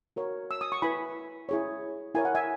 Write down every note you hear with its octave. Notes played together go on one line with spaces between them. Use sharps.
F#4 A#4 C#5
E6
D#6
C#6
E4 B4 G#5 B5
E4 G#4 C#5
E4 A#4 C#5 G#5
F#5
E5 G#5